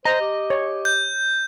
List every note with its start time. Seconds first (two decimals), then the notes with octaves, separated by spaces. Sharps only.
0.05 C5 D#5 A#5
0.21 G4
0.50 C#5
0.85 G6